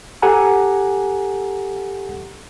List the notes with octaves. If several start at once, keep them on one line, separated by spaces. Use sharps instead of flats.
G4 A4 F#5 G#5 A#5